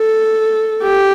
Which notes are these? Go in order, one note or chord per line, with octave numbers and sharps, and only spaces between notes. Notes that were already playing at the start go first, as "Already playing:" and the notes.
Already playing: A4
G4